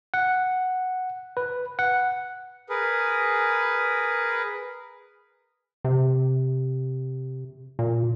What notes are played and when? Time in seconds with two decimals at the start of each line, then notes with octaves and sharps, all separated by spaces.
0.14 F#5
1.37 B4
1.79 F#5
2.69 G#4 A#4 B4
5.85 C3
7.79 A#2